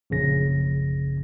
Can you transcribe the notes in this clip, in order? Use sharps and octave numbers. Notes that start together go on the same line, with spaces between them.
A#1 F#2 C#3 A#6